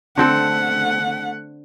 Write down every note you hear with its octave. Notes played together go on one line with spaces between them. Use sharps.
D3 A3 C4 A4 F#5